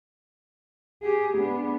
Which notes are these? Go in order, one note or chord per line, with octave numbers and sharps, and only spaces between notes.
G4 G#4
B3 D4